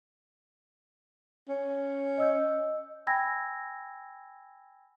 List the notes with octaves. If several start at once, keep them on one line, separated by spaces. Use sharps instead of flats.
C#4
D#5 E6 G6
G5 G#5 B5 E6 G#6 A#6